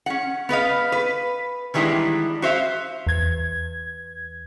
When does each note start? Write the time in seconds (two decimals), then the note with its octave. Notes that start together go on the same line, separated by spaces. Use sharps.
0.06 C#4 F#5
0.49 B3 B4 D#5 F5
0.92 B4
1.74 D#3 E3 G3 G#3 B3 D4
2.42 F#4 C5 E5 F5
3.07 E2 G#6